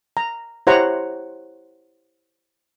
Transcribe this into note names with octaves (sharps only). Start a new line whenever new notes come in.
A#5
E4 G4 C5 C#5 F#5 A#5